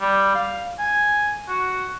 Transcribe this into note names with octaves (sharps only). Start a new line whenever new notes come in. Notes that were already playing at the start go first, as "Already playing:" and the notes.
G3
F5
G#5
F#4